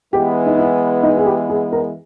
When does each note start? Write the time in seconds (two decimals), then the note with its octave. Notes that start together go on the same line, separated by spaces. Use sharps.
0.13 E3 G#3 B3 G4
0.47 D#4
0.59 E4
1.03 D#4
1.18 G#4
1.26 G4
1.50 G#4
1.73 A#4